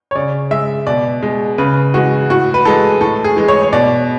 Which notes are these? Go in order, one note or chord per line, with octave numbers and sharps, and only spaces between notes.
C#5
C#3 D5
G#3 E5
B2 D5
G#3
C#3 B4
E3 G#3 F#4
A2 F#4
B4
E3 G#3 A4
A2 A4
G#4
E3 G#3
C#5
C#5
B2 D5